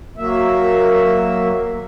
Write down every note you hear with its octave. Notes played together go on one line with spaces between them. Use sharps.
F#3 A#3 E5